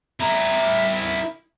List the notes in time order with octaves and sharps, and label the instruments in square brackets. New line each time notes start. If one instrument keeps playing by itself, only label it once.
[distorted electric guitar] E4 A#4